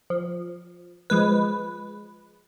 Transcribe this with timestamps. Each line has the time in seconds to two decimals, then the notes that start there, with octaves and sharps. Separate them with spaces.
0.10 F3
1.10 F3 G#3 B4